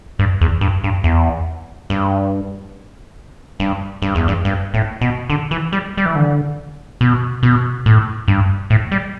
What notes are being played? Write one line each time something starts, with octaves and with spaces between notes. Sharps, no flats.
G2
E2
G2
G2
E2
G2
G2
G2
E2
G2
G2
A2
B2
D3
E3
G3
G3
E3
D3
B2
B2
A2
G2
A2
G3